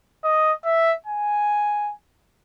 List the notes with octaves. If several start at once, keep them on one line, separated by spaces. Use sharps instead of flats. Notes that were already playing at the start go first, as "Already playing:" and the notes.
D#5
E5
G#5